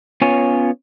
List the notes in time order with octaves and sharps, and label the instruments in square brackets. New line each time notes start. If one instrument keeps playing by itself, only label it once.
[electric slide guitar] B3 C#4 F4 C#5 G#5